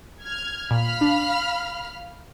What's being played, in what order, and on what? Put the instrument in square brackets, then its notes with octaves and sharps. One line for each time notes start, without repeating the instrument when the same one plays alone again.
[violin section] F6 G#6
[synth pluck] A#2 [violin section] F5 B5 F6
[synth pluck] D4